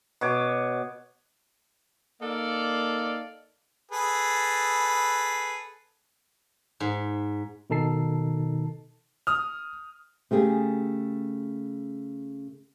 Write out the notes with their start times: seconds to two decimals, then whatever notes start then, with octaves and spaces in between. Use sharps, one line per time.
0.21 B2 C#5 D6
2.21 A#3 D#4 A4 D5 F5
3.91 G#4 A4 B4
6.80 G#2
7.70 B2 D#3 D#4 A4 A5 C7
9.27 D#6 F6
10.31 C#3 A3 G4 G#4